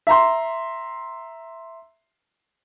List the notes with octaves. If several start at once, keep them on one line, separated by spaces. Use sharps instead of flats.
E5 A#5 C6